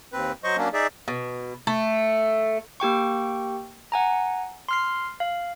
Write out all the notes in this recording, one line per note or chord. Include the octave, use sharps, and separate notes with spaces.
D#2 C4 B4
F#3 C5 D#5 C#6
F#3 A#3 C#4 D4
D#4 G#4 D5 E5
B2
A3
A#3 G4 G5 C#6
F#5 G#5 A#5
C6 F6 C7
F5